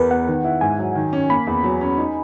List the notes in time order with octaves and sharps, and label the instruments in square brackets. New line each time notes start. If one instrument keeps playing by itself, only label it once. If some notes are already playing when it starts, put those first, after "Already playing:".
Already playing: [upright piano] E2 [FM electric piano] A#4 B4 B5
[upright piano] B3 [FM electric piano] F#5
[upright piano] D#3
E4
[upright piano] G#2 [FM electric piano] G#5
[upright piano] F#3
D#3
C#4
[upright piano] A#3 [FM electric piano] B5
[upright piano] E2
F#3
C#4
D#4